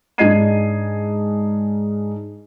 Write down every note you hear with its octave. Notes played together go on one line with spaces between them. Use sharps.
G#2 D4 D#5 G#6 C7 D#7